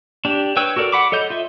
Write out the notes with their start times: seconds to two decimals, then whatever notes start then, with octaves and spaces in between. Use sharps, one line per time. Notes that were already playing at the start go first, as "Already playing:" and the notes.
0.25 D4 G4
0.57 B4 C#5 G5 E6
0.76 F#4 A4 A#4 D5
0.92 F#5 B5 D6
1.12 A4 C#5 D#5 G6
1.30 F4 D#5 E5